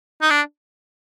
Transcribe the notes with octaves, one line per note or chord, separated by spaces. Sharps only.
D#4
D4